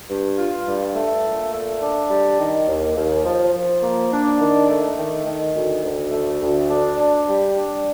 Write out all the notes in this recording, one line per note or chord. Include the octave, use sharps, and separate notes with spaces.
G2
F4
G2
A3
A#2
A3
D4
G3
D#3
D#2
D#2
F3
F3
A#3
D4
D#3
A3
D#3
D#3
D2
D2
A3
D2
D4
D4
G3
D4